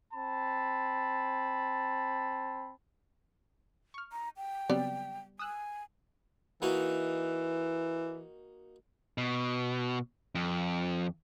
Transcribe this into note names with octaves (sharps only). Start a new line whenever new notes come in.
C4 A5 B5
C#6 F6
A#5
G5
C#3 F#3 G3 B3 C4 D5
G#5 D#6 E6 F#6
E3 A#3 D#4 F#4
B2
F2